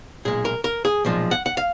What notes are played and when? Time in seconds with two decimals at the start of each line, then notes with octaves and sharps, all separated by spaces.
0.25 B1 A#2 G#3 G#4
0.45 A#4
0.64 A#4
0.85 G#4
1.05 B1 A#2 F3 G#3
1.31 F#5
1.46 F#5
1.57 F5